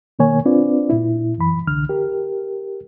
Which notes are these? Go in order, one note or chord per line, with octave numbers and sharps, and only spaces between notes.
B2 D#3 A#3 C#5 G#5
C4 D4 F4 B4 D5
A#2 E4
F#2 E3 B5
C2 D3 F6
G4 A#4